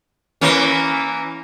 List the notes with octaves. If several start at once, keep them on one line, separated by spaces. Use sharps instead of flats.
E3 A#3 C#4